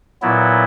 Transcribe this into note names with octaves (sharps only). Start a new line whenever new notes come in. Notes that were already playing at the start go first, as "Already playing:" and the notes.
A#2 F#3 B3 E4